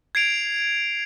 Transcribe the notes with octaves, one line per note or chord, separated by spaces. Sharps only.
G#6 C7 D7 F7